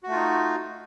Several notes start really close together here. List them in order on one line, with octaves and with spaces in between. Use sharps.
F#4 A3 F4 D#4